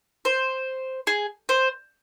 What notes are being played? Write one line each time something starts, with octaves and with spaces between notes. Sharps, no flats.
C5
G#4
C5